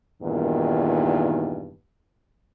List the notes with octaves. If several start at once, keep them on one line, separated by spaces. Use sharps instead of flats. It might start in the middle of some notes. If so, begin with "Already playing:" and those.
E2 G2 A#2 D#3